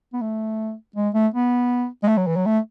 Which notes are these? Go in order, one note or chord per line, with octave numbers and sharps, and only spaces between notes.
B3
A3
G#3
A3
B3
G#3
A3
F#3
E3
F#3
A3